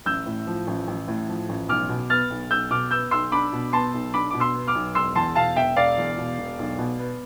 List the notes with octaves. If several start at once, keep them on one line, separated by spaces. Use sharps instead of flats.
A1 E6 G6
A2
F3
A1
A1
A2
F3
A1
B1 D6 F6
B2
B3 F6 A6
B1
B1 E6 G6
B2 D6 F6
B3 E6 G6
B1 C6 E6
D4 B5 D6
B2
B3 A5 C6
B1
D4 B5 D6
B2 D6
C6 E6
B3
D6 F6
B1
E1 C6 E6
E2 A5 C6
B2 F5 A5
E1 E5 G5
E1 D5 F5
E2
B2
E1
B1
B2
B3